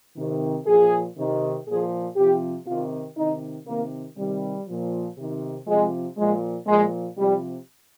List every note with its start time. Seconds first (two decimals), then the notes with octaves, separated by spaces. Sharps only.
0.17 C3 D#3
0.66 A#2 F3 G#4
1.17 C3 D#3
1.66 A#2 F3 G#4
2.17 C3 F3 G4
2.66 C3 D#3 F4
3.17 C3 D#3 D#4
3.67 C3 D#3 A#3
4.16 C3 D#3 G3
4.68 A#2 F3
5.17 C3 D#3
5.67 C3 F3 G#3
6.18 A#2 F3 G#3
6.67 A#2 F3 G#3
7.18 C3 F3 G3